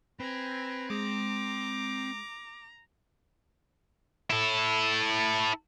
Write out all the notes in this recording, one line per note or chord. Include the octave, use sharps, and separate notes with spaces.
C4 B4 G#5 A#5
G#3 A#5 D6
E4 A4